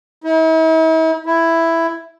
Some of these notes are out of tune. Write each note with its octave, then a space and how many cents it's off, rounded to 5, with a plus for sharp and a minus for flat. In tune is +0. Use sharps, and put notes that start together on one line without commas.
E4 -45
E4 +5